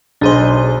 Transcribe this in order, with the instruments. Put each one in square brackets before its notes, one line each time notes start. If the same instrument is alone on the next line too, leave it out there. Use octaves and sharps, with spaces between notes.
[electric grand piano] B1 D#5 [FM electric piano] D4 G#4 C5